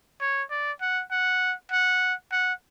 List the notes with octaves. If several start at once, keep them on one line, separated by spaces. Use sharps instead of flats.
C#5
D5
F#5
F#5
F#5
F#5